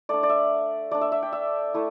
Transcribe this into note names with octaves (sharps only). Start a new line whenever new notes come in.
A3 D4 D5
D5
E5
A3 D4 D5
E5
E5
G5
E5
A3 E4